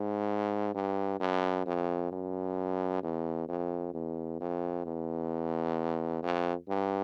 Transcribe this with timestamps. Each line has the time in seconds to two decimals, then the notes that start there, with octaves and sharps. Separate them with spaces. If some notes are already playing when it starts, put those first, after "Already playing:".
Already playing: G#2
0.74 G2
1.20 F#2
1.66 F2
2.12 F#2
3.03 E2
3.48 F2
3.94 E2
4.41 F2
4.85 E2
6.23 F2
6.69 G2